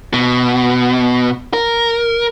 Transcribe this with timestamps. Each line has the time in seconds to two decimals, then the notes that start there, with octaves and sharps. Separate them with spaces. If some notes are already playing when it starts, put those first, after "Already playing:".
0.13 B2
1.53 A#4